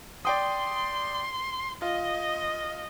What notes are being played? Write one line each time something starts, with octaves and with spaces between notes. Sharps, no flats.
D5 G5 C6 D#6
F4 D#5